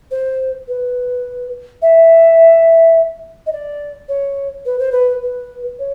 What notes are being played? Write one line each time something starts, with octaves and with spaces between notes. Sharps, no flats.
C5
B4
E5
D#5
D5
C#5
B4
C5
B4
B4
C#5